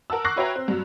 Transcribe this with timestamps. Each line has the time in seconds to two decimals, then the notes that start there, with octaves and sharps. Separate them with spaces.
0.10 A#4 F#5 A5 E6
0.24 C#6 D6 F#6 A#6 C7
0.36 F#4 B4 C#5 E5 G5 A#5
0.55 C4
0.68 G2 F#3